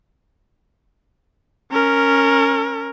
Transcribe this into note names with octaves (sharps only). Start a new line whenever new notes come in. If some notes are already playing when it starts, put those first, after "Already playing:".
C#4 A#4